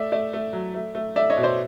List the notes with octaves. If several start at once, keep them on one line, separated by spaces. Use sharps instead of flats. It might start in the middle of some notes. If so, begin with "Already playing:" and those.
Already playing: A3 D5 E5
A3 D5 E5
A3
F#3
A3
A3
A3 D5 E5
C#5 D#5
B2
C5 D5